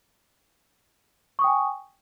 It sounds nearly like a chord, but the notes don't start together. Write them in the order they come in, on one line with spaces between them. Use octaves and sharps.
C#6 D#6 G5 G#5